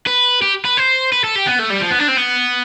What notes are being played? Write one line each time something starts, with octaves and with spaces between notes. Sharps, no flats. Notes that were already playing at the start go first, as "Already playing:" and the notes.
B4
G4
B4
C5
B4
A4
G4
B3
A3
G3
F3
B3
D4
C4
B3